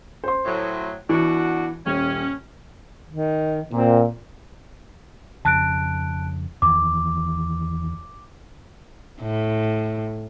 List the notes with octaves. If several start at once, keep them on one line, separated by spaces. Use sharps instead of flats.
C5 C6
A2 F#3
B2 E3 D4 F#4
D#1 C#4
D#3
A#2 C4
F2 C#3 A5 F#6 D7
E2 D#3 E3 D6
A2